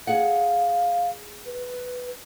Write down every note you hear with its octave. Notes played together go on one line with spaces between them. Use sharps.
G#4 F5 F#5
B4